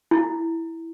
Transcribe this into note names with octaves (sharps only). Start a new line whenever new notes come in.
E4